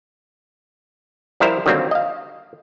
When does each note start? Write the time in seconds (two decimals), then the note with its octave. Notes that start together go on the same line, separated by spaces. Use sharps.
1.40 F3 G3 E4 A#4 C5 E5
1.66 D3 D#3 F#3 G3 A#3 C4
1.91 D#5 F5